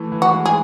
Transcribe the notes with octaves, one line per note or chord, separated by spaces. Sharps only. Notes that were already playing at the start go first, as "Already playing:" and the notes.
Already playing: E3 A3
E3
F#4
G#3
G#4